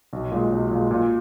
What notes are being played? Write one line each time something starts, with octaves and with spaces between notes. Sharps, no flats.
B1
A#2 G#3
B1
A#2 G#3
A#2